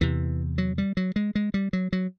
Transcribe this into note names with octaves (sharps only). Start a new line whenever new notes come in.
E2 C3 E3
F#3
G3
F#3
G#3
G#3
G3
F#3
F#3